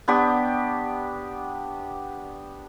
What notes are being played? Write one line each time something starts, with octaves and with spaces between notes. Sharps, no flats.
B3 D4 G4 C#6